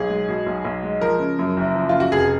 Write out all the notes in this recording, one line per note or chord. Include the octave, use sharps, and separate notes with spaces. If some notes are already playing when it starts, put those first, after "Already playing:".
Already playing: B1 G#4
G#3
B2
B1
B1
G#3
F3 A#4
C#3
F#2
F#1
F3
C#3 F4
F#4
F1 G#4